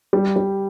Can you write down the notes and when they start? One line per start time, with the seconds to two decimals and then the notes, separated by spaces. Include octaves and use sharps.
0.13 G3
0.36 G3